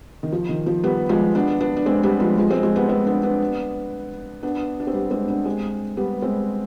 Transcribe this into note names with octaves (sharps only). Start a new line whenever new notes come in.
D#3
F3
D#3
F3
G3 B3
F3 G#3
B3 D4
B3 D4
D4
G#3 C4
G3 B3
F3 G#3
F3 G#3
G#3 C4
F3 G#3
G3 B3
G#3 C4
B3 D4
B3 D4
B3 D4
D4
C4
G3 B3
G#3 C4
B3 D4
G#3 C4
G3 B3
G#3 C4